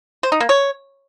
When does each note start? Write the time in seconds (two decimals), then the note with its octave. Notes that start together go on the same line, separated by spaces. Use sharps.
0.23 C5
0.32 D#4
0.40 A#3
0.49 C#5